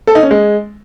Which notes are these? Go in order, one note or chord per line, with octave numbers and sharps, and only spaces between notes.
A4
D#4
C#4
G#3